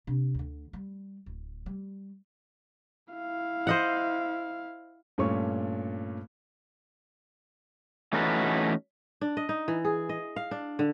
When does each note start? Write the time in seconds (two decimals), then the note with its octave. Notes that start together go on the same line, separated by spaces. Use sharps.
0.07 C3 D4
0.35 D2 D3
0.73 G3
1.26 D1
1.66 G3
3.14 E4 F5
3.67 C5 D#5 F#5
5.18 G2 A#2 A3 C#4 C#6
8.13 E3 A3 C#4 D#4 F#4 B4
9.21 D4
9.37 D#5
9.49 D#4
9.68 E3
9.85 G#4
10.09 D#5
10.36 F5
10.51 D4
10.79 D3